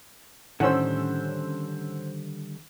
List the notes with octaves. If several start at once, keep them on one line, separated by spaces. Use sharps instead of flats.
A2 D3 D#3 G3 C#4 C5 F#5 E6